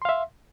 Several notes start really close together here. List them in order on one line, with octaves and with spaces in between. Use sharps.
C6 F5 E5